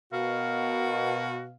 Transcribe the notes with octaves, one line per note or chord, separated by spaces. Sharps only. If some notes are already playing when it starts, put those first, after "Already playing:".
B2 F#4 A#4 F5